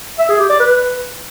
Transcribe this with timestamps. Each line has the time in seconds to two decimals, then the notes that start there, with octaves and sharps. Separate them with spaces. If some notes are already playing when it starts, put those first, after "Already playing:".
0.19 E5
0.29 G#4
0.39 G4
0.49 D5
0.60 B4